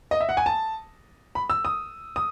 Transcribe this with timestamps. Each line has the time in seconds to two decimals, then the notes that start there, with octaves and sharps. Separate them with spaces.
0.11 D#5
0.21 E5
0.29 F#5
0.37 G#5
0.46 A5
1.35 B5
1.50 E6
1.65 D#6
2.16 D#6